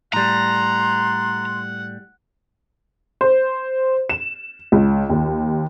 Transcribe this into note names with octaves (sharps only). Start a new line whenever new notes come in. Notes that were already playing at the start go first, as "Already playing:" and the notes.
A2 G3 F#5 A#5 C6
C5
E7
C#2
D#2